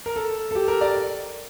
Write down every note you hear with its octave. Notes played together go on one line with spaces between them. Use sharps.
A#4
A4
A4
G4
A#4
D5